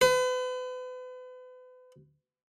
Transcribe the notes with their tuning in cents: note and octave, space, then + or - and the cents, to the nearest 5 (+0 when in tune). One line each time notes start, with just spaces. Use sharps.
B4 +40